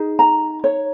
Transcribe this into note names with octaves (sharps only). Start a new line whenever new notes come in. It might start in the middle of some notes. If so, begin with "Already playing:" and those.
Already playing: D#4 G#4
A#5
C#5